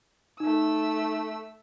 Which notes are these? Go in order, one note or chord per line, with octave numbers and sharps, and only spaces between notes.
A3 D#4 E6